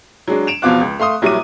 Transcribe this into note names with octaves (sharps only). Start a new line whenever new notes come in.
F#3 G#3 D4
D7 E7 F7
E2 B2 F3 F4 D6 F#6
C#2
A3 F5 C6 D#6
A#1 F#3 G3 E4 D6 D#7